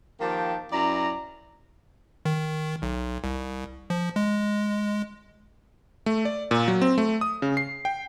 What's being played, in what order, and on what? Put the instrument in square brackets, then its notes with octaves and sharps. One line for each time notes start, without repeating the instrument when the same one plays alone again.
[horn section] D#3 F3 A#3 G4 G5 A5
F#2 E4 D5 A#5
[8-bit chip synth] D#3
B1
C2
F3
G#3
[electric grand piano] A3
D5
A#2
F#3
C4
A3
D#6
C#3
C7
G5